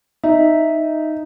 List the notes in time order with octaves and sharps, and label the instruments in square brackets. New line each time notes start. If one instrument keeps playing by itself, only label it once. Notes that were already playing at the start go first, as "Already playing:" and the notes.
[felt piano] D#4 [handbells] E5